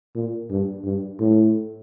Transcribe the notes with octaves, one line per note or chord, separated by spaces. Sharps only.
A#2
G2
G2
A2